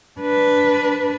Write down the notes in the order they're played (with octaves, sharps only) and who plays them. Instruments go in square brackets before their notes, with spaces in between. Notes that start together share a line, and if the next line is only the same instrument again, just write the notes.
[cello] D4 B4